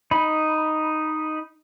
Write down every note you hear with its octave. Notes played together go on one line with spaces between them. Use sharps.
D#4 B5